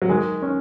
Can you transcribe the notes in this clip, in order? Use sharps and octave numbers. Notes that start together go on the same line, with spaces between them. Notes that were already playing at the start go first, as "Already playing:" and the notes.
F#3
D#3 G#3
C#4